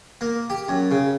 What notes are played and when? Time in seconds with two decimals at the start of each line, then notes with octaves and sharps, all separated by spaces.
0.21 A#3
0.50 G4
0.68 F#2
0.91 C#3